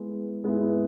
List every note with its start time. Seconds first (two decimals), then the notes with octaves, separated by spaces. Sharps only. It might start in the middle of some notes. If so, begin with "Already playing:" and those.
Already playing: G#3 B3 E4
0.44 G#3 B3 E4